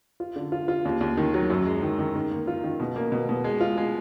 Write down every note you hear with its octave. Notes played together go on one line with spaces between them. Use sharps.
F4
D3
F4
F4
D#2
D#2
D#3
F#3
F#2
G#3
D#3
D#3
D#3
A#3
F4
D#3
B2
A#3
B2
B2
G#3
F4
G#3